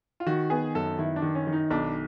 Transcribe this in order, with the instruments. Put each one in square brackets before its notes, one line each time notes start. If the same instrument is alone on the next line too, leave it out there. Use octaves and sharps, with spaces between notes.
[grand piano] F4
[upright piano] D#3 [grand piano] F#4
[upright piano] B3 [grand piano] G#4
[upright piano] F#2 [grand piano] A4
[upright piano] D#3 [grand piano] E4
[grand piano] D4
[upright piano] D#3
[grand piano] C#4
[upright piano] D#3
[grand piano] D#4
[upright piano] B1 [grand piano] D4